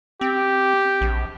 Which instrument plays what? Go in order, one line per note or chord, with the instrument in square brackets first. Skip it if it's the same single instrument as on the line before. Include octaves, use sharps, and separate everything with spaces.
[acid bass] C4 [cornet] G4
[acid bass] A#1